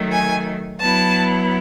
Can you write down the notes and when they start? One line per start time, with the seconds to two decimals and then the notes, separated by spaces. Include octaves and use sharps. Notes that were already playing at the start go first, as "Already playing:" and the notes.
Already playing: D#3 F#3 A3
0.12 G#5
0.80 F#3 B3 E4 A5